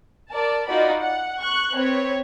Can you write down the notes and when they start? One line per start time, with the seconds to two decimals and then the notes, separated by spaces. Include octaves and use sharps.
0.30 A#4 D5 A5
0.67 D#4 F4 F#4 D5 D#5 B5
0.99 F#5
1.39 C#6 F#6
1.73 C4 B4 C#5